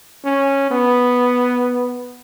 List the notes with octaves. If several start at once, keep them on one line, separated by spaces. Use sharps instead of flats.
C#4
B3